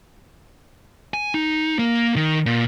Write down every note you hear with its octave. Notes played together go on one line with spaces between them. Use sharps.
G#5
D#4
A#3
D#3
A#2